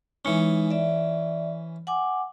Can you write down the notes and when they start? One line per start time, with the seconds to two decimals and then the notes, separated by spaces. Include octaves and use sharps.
0.25 E3 G#3 C#4 D#4
0.71 D5 E5
1.87 F#5 G#5 D6